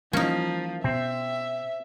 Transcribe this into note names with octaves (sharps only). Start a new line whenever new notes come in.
E3 F3 G3 A#3 C#4 D#4
B2 C4 E5